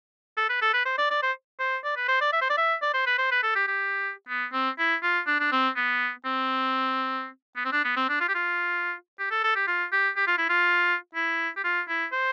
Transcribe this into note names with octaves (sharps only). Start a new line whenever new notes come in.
A4
B4
A4
B4
C5
D5
D5
C5
C5
D5
B4
C5
D5
E5
C5
D5
E5
D5
C5
B4
C5
B4
A4
G4
G4
B3
C4
E4
F4
D4
D4
C4
B3
C4
B3
C4
D4
B3
C4
D4
F4
G4
F4
G4
A4
A4
G4
F4
G4
G4
F4
E4
F4
E4
G4
F4
E4
C5